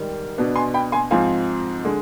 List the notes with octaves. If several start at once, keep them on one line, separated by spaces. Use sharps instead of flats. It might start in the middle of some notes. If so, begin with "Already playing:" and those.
Already playing: G#2 D#3 G3
B2 B3 D4
G#5 C6
G5 B5
G#5 C6
G#2 F3 C4 F5 G#5
D3 G#3